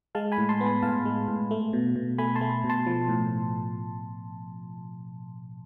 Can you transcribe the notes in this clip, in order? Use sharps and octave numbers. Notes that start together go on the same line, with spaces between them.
G#3 F5 A5
G#5 B5
A2
A5 C6
B3
G#5 B5
A2 F5 A5
G#3
A2
A3
B2
B2
A3 G#5 B5
A5 C6
A3
B2
A5 C6
F3
A2